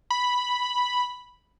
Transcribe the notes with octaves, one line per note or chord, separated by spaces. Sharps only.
B5